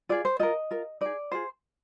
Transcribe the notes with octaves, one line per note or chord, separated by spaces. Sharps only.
F4 G#4 D5
C5
F4 A#4 D#5
F4 A#4
D#4 G#4 D5
F4 G#4 C5